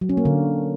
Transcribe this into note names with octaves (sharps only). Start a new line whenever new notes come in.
F#3
C#4
A#3
D3